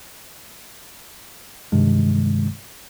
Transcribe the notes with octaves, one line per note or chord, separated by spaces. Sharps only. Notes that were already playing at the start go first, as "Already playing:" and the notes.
G2 C3 D#3 G#3